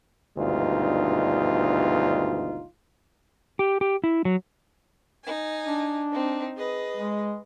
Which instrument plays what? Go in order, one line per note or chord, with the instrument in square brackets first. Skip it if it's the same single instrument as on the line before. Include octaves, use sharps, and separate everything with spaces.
[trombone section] G#1 D2 G2 B2 D#4 F4
[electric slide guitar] G4
G4
E4
F#3
[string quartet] D#4 G#5
[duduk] D4
[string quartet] C4 D#4
G#4 B4 D#5
[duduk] G#3